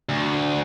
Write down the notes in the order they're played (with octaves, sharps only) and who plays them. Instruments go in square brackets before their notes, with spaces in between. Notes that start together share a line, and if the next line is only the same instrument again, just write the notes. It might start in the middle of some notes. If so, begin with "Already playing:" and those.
[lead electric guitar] D2